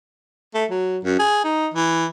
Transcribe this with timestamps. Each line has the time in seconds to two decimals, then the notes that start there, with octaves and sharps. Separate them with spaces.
0.55 A3
0.70 F#3
1.04 F#2
1.19 G#4
1.44 D#4
1.74 E3